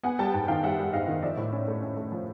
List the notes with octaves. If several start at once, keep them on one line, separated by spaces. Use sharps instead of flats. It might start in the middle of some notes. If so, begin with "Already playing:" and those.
B3 F#5 G#5
G3 G5 A5
G#2 G5 A5
D#3 F5 G5
G3 E5 F#5
G3
G#2 D#5 F5
D#3
F3 D5 E5
A2
C#4
A3
C#4
A3
F3